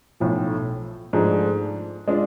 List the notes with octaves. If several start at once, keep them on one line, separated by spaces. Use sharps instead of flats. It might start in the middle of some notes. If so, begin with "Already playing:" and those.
B1 A2 F3
G#2 F3 A3 D4 G#4
G#3 D4 F4